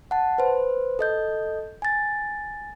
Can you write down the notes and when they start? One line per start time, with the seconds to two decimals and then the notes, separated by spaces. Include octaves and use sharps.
0.11 F#5 A5
0.38 B4 C5
0.99 A4 D#5 G6
1.82 G#5 A6